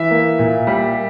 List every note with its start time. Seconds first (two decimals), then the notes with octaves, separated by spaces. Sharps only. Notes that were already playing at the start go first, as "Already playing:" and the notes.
Already playing: E3 E5
0.11 A#3
0.39 A#2
0.67 G3